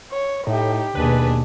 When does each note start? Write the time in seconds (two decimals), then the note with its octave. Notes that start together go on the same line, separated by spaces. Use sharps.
0.12 C#5
0.47 A2 D#4 G4
0.95 D#2 B2 D4 G#4 B4